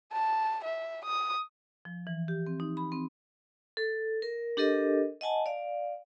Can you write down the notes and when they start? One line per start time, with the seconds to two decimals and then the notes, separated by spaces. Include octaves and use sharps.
0.13 A5
0.64 E5
1.05 D#6
1.85 F3
2.07 E3
2.28 G4
2.47 C4
2.60 D#4
2.77 B5
2.92 C4
3.77 A4
4.22 A#4
4.57 D4 G4 A4 A#4 D#5
5.21 D#5 F#5 G#5 A5
5.46 D5 F5